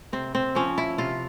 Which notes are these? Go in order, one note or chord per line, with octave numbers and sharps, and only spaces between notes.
C3 C4
C4
F3 C#4
E4
C3 F4